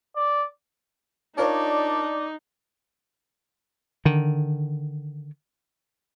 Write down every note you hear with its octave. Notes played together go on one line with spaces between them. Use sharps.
D5
D4 D#4 F4 A#4 C#5 D5
D3 D#3